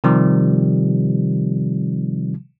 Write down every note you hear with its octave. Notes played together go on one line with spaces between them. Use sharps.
C3 D#3 F3 G3